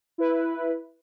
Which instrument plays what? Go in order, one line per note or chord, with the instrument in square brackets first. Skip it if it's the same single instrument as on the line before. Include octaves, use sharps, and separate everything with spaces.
[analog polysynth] E4 B4